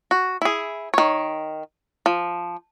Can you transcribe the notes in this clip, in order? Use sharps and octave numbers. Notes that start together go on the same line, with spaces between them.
F#4
E4 G#4
D#3 C#5
F3